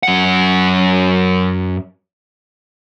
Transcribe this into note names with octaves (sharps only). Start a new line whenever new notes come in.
F#2 F#5